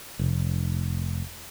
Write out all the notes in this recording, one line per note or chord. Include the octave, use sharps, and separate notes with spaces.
F1